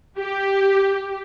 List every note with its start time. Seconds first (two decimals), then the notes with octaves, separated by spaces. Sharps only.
0.18 G4